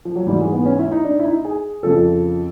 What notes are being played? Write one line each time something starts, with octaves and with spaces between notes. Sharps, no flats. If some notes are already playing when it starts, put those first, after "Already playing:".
F3
F#3
G#2 E3 G3
G#3
B3
C#4
E4
D#4
D4
E4
D#4
G#4
F2 C#3 F3 A4